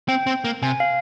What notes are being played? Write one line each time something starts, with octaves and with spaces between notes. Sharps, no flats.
C4 G5
C4
A#3
C3 G#5
F5